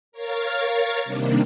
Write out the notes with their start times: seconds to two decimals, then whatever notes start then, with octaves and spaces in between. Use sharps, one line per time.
0.12 A#4 C#5 F5 C#6 F6 A6
1.04 C3 D#3 G3 A#3 D4